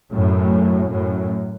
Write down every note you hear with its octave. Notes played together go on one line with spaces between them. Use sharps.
F#2 A2
F#2 A2